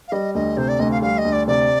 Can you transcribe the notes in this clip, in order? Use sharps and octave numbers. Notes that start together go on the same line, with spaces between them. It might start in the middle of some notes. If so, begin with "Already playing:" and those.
F5
G3 D#5
D2 D#5
C3 C5
D5
D2 D#5
F5
G3 F5
D#5
D2
D5
C3 D5